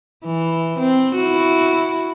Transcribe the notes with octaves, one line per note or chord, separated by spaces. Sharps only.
E3
C4
E4 F#4